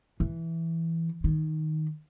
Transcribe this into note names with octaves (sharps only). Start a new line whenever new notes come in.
E3
D#3